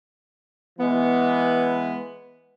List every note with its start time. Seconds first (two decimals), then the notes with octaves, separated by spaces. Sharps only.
0.79 E3 G#3 B3